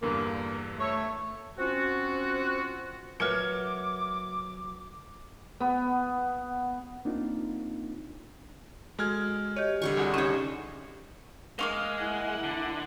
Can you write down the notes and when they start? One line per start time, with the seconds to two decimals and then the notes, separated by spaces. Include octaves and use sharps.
0.02 E2 G2 D3 A#3
0.79 A3 C#5
1.59 C4 C#4 F4 F#4
3.20 F#3 A#4 B4 E5 D6 F6 G#6 C#7
5.60 B3
7.05 A#3 C4 D4 D#4 F4
8.99 G#3 F#4 A4 F6 G#6
9.56 G4 C#5 D#5
9.82 D3 G3 C#6
9.97 C2 G#4 F#5
10.14 C#4 D#4 G4 C#5 D#5
11.59 G#3 A#3 C#4 F5
11.98 E4 F#5
12.44 D3